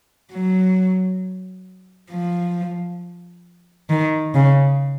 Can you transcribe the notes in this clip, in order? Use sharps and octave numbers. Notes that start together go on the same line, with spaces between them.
F#3
F3
D#3
C#3